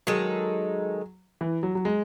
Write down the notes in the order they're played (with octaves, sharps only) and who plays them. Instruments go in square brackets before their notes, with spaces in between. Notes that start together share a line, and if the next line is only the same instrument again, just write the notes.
[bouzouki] D#3 G#3 D#4 A4 [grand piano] F#3
[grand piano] E3
F#3
F#3
G#3